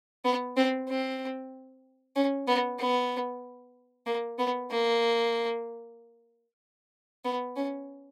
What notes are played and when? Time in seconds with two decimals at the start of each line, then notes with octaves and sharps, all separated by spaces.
0.25 B3
0.57 C4
0.89 C4
2.16 C#4
2.47 B3
2.79 B3
4.07 A#3
4.38 B3
4.70 A#3
7.25 B3
7.56 C#4